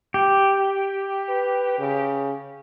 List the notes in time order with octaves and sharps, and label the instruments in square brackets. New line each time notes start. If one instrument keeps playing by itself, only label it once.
[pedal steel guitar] G4
[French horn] B4
C#3